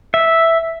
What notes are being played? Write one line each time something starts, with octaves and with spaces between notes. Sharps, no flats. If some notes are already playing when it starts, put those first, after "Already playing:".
E5